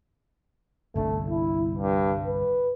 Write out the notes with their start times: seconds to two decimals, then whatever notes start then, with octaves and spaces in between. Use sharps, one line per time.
0.96 G1 C2 A3 D4
1.29 E4
1.78 G2
2.27 B4